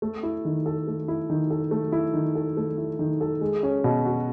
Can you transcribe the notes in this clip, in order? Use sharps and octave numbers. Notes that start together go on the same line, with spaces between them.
A3
E4
D#3
A4
A3
E4
D#3
A4
A3
E4
D#3
A4
A3
E4
D#3
A4
G#3
C#4
B2
F#4